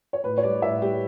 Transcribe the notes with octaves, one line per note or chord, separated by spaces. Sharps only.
C#5
A2 B4
C#5
G3 D5
A2 E5
G3 G4